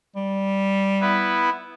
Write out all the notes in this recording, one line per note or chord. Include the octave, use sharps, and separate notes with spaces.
G3
B3 E4 B4